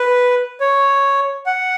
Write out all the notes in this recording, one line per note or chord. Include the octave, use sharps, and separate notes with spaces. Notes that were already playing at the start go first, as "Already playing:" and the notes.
Already playing: B4
C#5
F#5